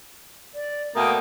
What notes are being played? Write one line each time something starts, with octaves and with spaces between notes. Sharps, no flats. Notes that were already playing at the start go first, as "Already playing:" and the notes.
D5
B2 A3 A#3 G5 D#6